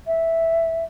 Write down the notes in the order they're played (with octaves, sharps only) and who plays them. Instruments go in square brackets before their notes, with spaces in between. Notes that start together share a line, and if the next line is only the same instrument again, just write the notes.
[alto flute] E5